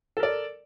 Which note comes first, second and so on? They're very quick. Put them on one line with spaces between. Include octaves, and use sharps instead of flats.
A4 A#4 D5